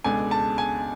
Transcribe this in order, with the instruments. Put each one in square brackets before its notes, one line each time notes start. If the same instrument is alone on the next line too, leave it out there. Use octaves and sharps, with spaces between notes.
[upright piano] C#2 B2 G#3 D4 A4 [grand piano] G#5
[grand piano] A5
G#5